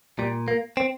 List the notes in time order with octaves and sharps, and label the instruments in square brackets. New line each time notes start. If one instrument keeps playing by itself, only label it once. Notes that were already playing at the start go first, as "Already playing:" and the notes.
[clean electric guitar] A#2 G3
A#3
C4